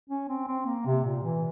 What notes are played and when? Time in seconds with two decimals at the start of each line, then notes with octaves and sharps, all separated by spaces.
0.10 C#4
0.28 C4
0.48 C4
0.66 A#3
0.86 C3
1.05 A#2
1.24 E3